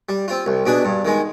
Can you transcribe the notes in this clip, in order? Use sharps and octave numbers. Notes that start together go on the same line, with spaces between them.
G3
C4 F4
C2
B2 B3 D4 G#4
G2
D#3 G#3